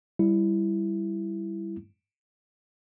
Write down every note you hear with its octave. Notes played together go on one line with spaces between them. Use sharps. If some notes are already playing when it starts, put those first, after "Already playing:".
G3 E4